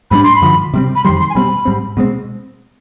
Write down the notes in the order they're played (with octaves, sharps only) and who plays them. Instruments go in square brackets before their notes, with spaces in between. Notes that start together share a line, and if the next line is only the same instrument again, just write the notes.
[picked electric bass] G#2 G3 B3 D4 [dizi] B5
[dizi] C6
B5
[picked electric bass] G2 D3 F3
C3 G3 C4
[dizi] B5
[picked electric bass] F2 D#3 G3 [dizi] C6
[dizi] B5
C6
G#5
[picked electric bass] B2 G3 C4 [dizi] B5
[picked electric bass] G#2 G3 C4
B2 G#3 C4